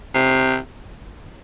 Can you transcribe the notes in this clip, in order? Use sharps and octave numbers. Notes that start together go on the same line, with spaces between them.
C3